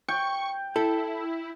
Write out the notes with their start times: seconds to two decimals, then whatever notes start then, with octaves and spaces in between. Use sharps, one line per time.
0.08 G5 C#6
0.76 E4 A4